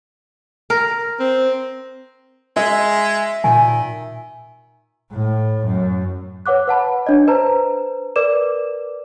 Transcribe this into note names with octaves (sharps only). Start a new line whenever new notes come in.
A#4
C4
G#3 E5
A#2 D#3 G#5
A2
F#2
B4 C#5 F#5 D6 F#6
B4 F#5 A5 B5
D4 C#5 D#5
B4 C5 A5 A#5
A#4 B4 D5 D6 E7